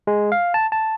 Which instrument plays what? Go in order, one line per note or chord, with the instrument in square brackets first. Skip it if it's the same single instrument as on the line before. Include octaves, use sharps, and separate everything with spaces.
[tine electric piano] G#3
F5
A5
A5